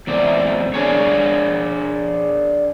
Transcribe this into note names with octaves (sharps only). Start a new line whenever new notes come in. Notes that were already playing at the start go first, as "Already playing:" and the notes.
E2 C3 D5
D4 G#4 C#5